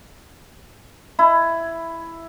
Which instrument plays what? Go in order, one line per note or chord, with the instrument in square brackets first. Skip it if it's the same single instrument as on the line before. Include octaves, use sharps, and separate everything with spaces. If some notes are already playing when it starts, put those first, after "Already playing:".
[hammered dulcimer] E4